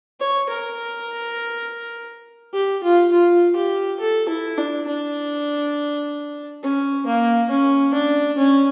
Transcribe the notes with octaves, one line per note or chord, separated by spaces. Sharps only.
C#5
A#4
G4
F4
F4
G4
A4
E4
D4
D4
C#4
A#3
C#4
D4
C#4